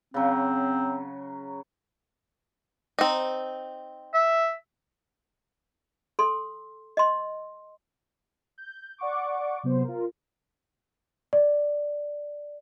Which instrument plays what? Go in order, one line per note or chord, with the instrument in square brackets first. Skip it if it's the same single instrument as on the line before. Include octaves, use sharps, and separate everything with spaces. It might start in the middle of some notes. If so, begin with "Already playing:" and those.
[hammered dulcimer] C#3 F#3 [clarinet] C4
[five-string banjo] C4 D#4
[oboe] E5
[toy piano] A4 C6
D#5 C6
[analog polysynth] G6
D5 F#5 C#6 D6
C3 F#3 B3 C5
F4 A#4
[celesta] D5